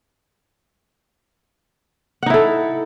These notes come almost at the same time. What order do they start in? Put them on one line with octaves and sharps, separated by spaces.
F#5 D#4 E4 A4